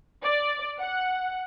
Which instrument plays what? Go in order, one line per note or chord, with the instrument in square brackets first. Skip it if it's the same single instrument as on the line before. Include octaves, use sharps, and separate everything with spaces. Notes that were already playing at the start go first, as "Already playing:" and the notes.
[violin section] D5
F#5